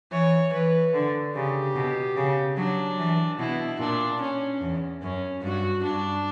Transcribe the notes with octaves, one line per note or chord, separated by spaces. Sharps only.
E3 C#5
E3 B4
D3
C#3 G4
B2
C#3
F#3 D4
E3
B2 E4
A#2 D4
C#4
E2
F#2 C#4
G2 F#4
G2 D4